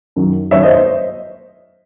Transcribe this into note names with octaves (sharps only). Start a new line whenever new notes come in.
F#2 D#3 F#3
F#2 D#3 F#3 C#5 E5
C5 D#5
C5 D#5